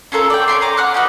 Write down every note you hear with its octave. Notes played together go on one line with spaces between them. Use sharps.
C#4 F4 A4 A#4
D5 G5
C#5 E5 G5 C6
G#5 A#5 D6
F#5 D6 F6 F#6
C#4 D#4 F#4 B4